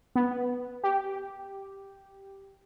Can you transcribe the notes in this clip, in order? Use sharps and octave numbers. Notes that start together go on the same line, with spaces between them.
B3
G4